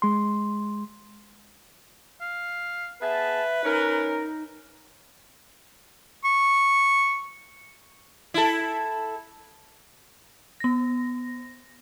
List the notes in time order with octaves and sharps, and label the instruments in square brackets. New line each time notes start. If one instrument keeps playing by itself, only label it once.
[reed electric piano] G#3 C6
[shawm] F5
[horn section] B3 G#4 A5 [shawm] B4 [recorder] E5
[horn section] C#4 A#4 [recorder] D#4
[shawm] C#6
[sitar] E4 A4
[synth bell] B3 A#6